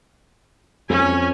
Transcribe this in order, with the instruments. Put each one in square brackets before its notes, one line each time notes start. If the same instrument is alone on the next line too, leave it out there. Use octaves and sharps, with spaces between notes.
[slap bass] F2 [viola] C#4 G#5